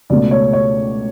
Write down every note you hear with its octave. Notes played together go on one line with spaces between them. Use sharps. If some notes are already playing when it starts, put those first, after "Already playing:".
C#2 B2 A3 D5
C#5
C#5